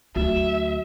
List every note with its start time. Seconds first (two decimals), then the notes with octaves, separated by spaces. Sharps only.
0.16 D2 F#3 E5